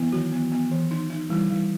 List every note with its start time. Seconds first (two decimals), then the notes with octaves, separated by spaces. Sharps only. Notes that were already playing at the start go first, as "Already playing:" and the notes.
Already playing: E3 B3
0.12 D#3 F#3 F#4
0.32 B3
0.52 B3
0.71 E3
0.91 D#4
1.10 D#4
1.29 E3 G3
1.50 E3 G3